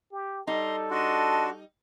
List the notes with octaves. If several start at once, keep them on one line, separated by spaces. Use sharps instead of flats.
G4
G3 D#4 A4 A#5 C6
D4 F#4 D#5 A5 C6